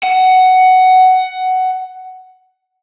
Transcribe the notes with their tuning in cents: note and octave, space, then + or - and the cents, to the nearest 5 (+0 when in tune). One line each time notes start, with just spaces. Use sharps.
F#5 +10